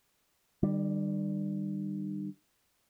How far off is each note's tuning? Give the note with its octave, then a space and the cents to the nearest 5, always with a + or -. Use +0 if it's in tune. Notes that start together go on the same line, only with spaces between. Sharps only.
D#3 -45 G3 +0